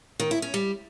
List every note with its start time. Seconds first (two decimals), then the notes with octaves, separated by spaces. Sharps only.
0.20 D#3
0.31 E4
0.42 C#4
0.54 G3